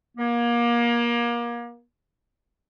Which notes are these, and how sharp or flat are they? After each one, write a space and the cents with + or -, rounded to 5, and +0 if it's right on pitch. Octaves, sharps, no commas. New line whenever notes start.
A#3 +30